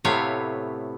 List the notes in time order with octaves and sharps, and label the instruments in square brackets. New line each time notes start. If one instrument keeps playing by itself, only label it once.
[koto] A2 C3 A3 B3 C#5 F5